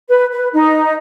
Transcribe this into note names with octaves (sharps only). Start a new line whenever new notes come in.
B4
B4
D#4